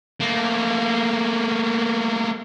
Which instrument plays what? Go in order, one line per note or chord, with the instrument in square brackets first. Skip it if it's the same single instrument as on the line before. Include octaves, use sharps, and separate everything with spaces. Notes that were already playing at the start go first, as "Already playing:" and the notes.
[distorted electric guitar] A3 A#3